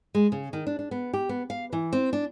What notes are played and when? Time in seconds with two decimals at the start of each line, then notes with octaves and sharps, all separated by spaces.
0.15 G#3
0.32 C#3
0.53 D#3
0.67 D4
0.79 D4
0.91 B3
1.13 G4
1.29 B3
1.50 F5
1.73 E3
1.93 C4
2.13 D4